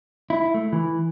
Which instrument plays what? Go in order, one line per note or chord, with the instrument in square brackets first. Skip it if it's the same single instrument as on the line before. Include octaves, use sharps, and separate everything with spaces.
[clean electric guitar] E4
A3
E3